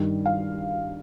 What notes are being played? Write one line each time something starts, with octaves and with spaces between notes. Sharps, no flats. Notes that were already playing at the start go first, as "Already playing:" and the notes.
Already playing: G2 D#3 G3
F5